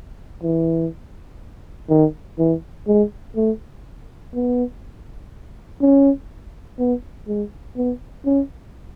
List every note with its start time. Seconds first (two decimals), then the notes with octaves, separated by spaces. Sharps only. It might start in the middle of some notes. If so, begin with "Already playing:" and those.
0.43 E3
1.90 D#3
2.39 E3
2.87 G#3
3.36 A3
4.35 B3
5.81 C#4
6.79 B3
7.28 G#3
7.77 B3
8.26 C#4